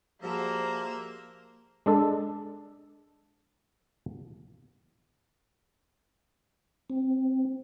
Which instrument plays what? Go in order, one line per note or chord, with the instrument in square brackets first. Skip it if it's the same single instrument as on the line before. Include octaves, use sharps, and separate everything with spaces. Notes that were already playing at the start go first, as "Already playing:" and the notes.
[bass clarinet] F3 [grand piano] G3 F#4 G#4 [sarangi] A#3 [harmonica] A#4 C5 E5
[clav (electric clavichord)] G#3 D4 A4
[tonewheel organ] C4